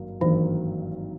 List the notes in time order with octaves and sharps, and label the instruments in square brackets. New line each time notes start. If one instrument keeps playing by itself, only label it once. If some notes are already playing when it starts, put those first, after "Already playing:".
Already playing: [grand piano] G#1 G2 D#3 F#3 A#3
[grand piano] G#1 G2 D#3 F#3 A#3 [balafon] E3